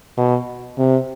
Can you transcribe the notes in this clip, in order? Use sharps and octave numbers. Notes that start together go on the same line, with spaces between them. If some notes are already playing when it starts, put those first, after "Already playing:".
B2
C3